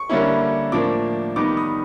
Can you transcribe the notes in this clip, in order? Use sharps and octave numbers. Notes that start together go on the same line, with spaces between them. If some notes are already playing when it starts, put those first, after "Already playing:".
Already playing: C#6
D3 G3 A#3 C#4 E4
A2 F3 A#3 D4 D6
D#3 G3 B3 D#4 D6
D#6